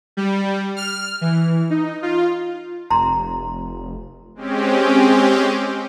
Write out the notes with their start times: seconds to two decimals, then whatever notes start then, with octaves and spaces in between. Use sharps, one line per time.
0.17 G3
0.77 F6
1.21 E3
1.70 D#4
2.02 F4
2.90 F1 A#5 C6
4.35 G#3 C4 C#4 G4